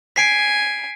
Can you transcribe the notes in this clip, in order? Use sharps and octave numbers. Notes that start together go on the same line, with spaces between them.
G#5 B6 C7 D7